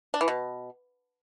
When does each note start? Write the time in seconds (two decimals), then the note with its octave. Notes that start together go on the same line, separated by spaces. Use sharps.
0.14 D4
0.21 E3
0.28 B2